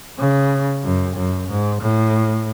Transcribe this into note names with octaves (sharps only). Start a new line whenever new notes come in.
C#3
F#2
F#2
G#2
A2